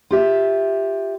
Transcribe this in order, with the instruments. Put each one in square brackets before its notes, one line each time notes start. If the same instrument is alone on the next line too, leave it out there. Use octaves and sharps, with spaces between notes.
[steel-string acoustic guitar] F4 G4 E5